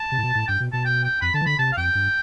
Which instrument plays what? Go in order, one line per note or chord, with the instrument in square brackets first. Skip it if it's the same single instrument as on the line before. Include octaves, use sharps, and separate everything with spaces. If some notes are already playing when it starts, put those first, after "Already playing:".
Already playing: [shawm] A5
[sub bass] C3
A2
B2
A2
[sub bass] G2 [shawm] G5
[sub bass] B2
[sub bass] B2 [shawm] A5
[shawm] G5
G5
[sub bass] F2 [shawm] B5
[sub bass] D3 [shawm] A5
[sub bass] E3
[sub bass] D3 [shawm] B5
[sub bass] C3 [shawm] A5
[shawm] F5
[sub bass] F2 [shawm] G5
[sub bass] G2